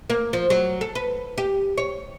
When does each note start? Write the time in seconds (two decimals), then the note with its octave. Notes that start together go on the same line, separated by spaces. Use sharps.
0.10 A#3
0.33 F3
0.50 F#3
0.81 A4
0.95 B4
1.38 G4
1.78 C#5